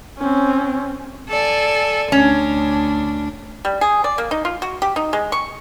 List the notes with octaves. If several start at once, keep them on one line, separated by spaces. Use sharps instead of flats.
C4 C#4
A4 D5 G#5
D2 C#4 D4
G3
G#4
D5
A#3
D#4
F4
F#4
G4
D#4
G#3
C#6